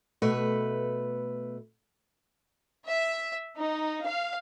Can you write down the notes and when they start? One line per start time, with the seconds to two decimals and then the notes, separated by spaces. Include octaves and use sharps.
0.22 B2 A3 B4
2.86 E5
3.56 D#4
4.04 F5